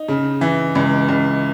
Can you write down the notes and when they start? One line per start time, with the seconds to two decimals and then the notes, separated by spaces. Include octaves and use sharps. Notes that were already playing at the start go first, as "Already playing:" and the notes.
Already playing: D#4
0.08 C#3
0.41 E3
0.75 C#2
1.08 C#2